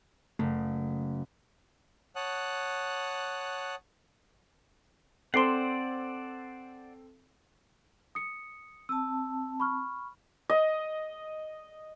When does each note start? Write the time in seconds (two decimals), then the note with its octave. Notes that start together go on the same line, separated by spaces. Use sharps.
0.39 F#1 A3
2.16 C#5 F#5 A5 D#6 F#6
5.34 C4 A4 C5 D5 F#5 C6 C7
8.15 D#6 C#7
8.89 C4 A5 E6
9.60 B5 C#6 F6
10.50 D#5